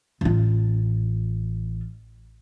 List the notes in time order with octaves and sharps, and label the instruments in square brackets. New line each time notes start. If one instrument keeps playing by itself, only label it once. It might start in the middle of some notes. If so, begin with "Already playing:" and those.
[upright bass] A1 F4